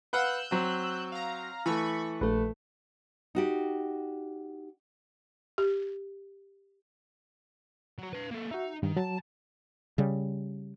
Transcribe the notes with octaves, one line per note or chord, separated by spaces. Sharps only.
B4 F5 F#5 E6 F#6 G6
F#3 C4
F5 A#5
E3 A3 B5 C#6
A#1 A3 B4
D#4 F#4 G4
G4
F#3 F#4
B4 F5
A#3 A4
D#4 F#4 E5
G2 D#3
F#3 A5
C#3 G3